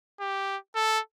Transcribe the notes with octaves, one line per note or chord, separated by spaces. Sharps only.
G4
A4